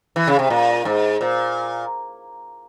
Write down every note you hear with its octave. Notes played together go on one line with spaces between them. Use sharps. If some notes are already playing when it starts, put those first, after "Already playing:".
E3
C#3
C3
A#2
G#2
A#2